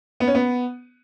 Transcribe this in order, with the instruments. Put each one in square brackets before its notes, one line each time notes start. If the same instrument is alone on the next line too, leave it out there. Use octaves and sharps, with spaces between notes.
[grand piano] B3
C#4
B3